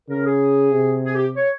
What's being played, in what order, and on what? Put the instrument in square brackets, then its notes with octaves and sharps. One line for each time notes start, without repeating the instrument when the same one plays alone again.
[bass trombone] C#3 [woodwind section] A#4
[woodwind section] G#4
[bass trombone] C3
[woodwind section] G#4
G4
C#5